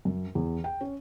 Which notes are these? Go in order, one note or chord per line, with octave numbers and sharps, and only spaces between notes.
F#2
E2
G5
C#4